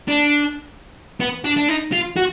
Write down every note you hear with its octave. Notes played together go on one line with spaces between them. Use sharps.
D4
B3
D4
D4
D#4
F4
F#4